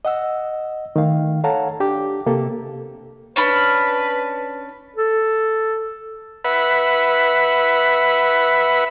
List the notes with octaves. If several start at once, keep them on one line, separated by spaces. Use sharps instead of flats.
D#5 F#5 E6
D#3 A3 F5
A4 C#5 F5 F#5 A5 A#5
D4 G4 D6
C3 A#3 G4 A4
C#4 D4 B4 B5
A4
B4 E5 F#5 B5